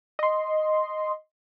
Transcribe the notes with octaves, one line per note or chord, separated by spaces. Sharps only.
D#5 C6